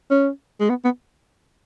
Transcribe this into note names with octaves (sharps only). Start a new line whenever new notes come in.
C#4
G#3
B3
B3